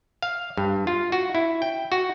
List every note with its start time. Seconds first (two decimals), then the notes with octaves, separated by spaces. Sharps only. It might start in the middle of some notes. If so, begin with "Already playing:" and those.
0.22 F5
0.57 G2
0.87 F4
1.12 F#4
1.35 E4
1.62 G5
1.92 F#4